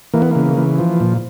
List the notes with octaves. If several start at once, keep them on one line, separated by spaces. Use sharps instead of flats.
E3 A#3
B3
C#3 A#3
E3
F3
A#2